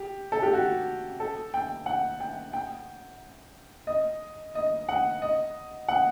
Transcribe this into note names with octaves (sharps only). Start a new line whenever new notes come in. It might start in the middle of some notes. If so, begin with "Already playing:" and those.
Already playing: G4
A4
G4
F#4
A4
G5
F#5
G5
G5
D#5
D#5
F#5
D#5
F#5